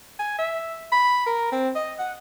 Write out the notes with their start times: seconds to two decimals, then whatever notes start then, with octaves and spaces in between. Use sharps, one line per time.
0.19 G#5
0.39 E5
0.92 B5
1.26 A#4
1.52 C4
1.75 D#5
1.99 F#5